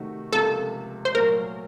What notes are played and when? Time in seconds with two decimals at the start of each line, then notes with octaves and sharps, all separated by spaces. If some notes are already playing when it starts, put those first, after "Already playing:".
Already playing: C3 D#3 A3 D#4 F#4
0.32 C#2 C3 F3 A#3 A4
1.05 C5
1.15 A#2 F#3 A3 A#4